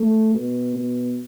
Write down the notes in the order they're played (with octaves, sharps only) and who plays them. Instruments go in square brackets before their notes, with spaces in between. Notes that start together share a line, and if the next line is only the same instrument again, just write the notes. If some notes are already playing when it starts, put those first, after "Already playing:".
Already playing: [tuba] A3
B2
B2